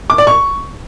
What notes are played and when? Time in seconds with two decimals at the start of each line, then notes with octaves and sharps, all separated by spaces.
0.10 D6
0.18 D5
0.27 C#6